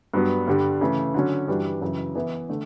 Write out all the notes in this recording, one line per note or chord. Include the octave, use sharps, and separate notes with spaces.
G2 F#3 B3
G2 D3 G3
C#3 E3 A3
D3 F#3 C#4
G2 E3 G3 D4 F#4
F#2 C#3 E3
E3 B3 E4
D3 A3